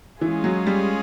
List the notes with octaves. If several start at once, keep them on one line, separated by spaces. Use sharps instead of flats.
E3 G#3 C#4 F4 G#4
F#3
G3